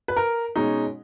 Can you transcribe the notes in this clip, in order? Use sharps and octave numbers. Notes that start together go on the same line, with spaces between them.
B4
A#4
B2 G#3 C#4 D#4